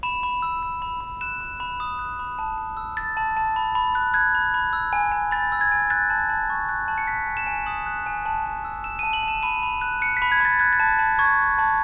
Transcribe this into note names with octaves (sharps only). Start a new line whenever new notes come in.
B5 E7
B5
E6
E6
B5
B5
F#6 E7
B5
B5
D#6
F#6
B5
A5
A5
E6
E6 A6
A5
A5
B5
B5
F#6
F#6 G#6
B5
B5
E6
G#5
G#5
B5 A6
E6
G#6
G#5
F#6 A6
A5
A5
C#6
F#6
A5
C#7
F#6 B6
G#5
E7
G#5
D#6 F#7
F#6
G#5
A5
A5
E6
E6 E7
D#7
A5
F#7
A5
E7
B5 D#7
B5
F#6
F#6 C#7
B6
B5
G#6
B5 A6
F#6 G#6
A6
A5
A5
C#6 G#6
F#6
A5